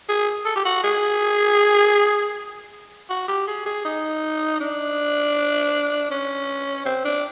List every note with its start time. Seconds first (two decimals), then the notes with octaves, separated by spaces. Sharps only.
0.09 G#4
0.45 A4
0.56 G4
0.65 F#4
0.84 G#4
3.09 F#4
3.28 G4
3.47 G#4
3.66 G#4
3.85 D#4
4.60 D4
6.11 C#4
6.85 C4
7.05 D4